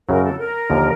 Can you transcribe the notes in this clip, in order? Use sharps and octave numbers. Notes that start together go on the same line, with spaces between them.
F#2 C#3 F#3 A#4
A4
A#4
D#2 D3 F3